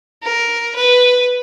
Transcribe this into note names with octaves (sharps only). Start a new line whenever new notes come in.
A#4
B4